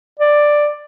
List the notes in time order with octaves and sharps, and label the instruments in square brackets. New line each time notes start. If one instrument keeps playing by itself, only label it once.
[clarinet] D5